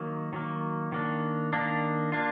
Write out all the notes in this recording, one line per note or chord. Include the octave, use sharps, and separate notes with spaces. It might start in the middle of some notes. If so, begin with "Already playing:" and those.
Already playing: D#3 F#3 A#3
D#3 F#3 A#3
D#3 A#3 D4
D#3 A#3 D4
A#3 D4 F4